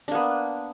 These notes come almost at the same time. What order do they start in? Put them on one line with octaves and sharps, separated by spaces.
D4 A#3 B3